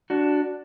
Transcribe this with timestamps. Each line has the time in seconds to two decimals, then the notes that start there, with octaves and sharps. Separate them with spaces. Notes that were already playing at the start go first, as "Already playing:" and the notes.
0.10 D4 F#4